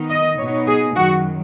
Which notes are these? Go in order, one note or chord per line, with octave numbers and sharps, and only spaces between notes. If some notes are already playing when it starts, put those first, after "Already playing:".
Already playing: D#3 B3 D#4
D#5
B2 B3 D#4 C#5
G#4
F#2 D#3 F#3 F#4